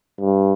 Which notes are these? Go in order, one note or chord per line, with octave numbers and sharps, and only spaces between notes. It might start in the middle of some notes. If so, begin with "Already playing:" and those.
G2